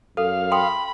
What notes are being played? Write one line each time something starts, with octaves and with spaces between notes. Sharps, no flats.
F#2 A4 F5
G5 B5 C6 D#6